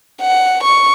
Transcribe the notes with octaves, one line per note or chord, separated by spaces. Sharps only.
F#5
C#6